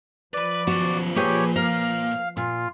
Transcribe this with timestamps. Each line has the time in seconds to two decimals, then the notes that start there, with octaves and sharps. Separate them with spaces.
0.34 F3 B4 D5 B5
0.67 F#2 B3 F#4
1.16 A#2 G4 G#4 B4 C#5 G5
1.56 A#4 F5
2.37 A#2 F4